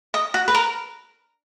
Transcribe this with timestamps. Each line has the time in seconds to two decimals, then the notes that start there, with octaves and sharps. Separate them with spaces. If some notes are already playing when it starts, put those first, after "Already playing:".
0.14 D#5
0.34 F#4
0.48 B4
0.55 A#4